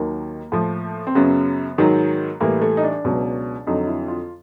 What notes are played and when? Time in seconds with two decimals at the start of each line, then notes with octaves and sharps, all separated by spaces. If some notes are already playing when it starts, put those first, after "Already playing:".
Already playing: D#2 D#3 F#3 A#3
0.52 A2 F3
1.07 C4
1.15 F#2 C#3 F#3 B3
1.78 G#2 D#3 F#3
2.40 A2 E3 G3 A#3
2.61 A3
2.77 D#4
2.83 D4
3.04 C#2 B2 F#3
3.67 F2 D3 F#3 D#4
3.87 E4
4.08 F4